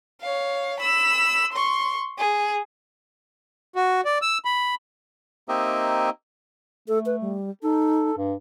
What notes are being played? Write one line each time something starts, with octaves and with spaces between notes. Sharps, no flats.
C#5 F5
B5 E6
C6 C#6
G#4
F#4
D5
E6
B5
A#3 C4 D#4 G4 D#5 E5
A3 A4
B4
G3
D#4 A4
G2